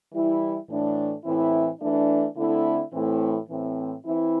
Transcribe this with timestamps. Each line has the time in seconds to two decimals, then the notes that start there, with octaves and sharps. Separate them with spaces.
0.12 E3 G3 E4
0.68 A2 E3 A3 D4
1.24 A2 E3 C4 E4
1.81 E3 A3 D4
2.36 D3 A3 C4 E4
2.93 A2 E3 A3 C4 E4
3.49 A2 E3 C4
4.06 E3 C4 E4